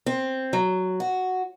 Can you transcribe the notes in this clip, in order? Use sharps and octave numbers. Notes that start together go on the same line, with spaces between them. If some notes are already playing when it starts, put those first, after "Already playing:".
C4
F#3
F#4